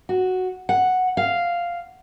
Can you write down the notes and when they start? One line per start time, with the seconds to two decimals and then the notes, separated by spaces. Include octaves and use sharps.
0.09 F#4
0.69 F#5
1.17 F5